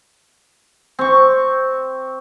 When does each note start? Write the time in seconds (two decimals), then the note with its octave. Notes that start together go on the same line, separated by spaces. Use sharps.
0.99 C4 C#6